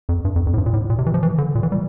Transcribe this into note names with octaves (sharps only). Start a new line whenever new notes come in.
F2
G2
F2
F2
A2
G2
A#2
A2
A#2
C3
E3
F3
E3
D3
A#2
E3
G3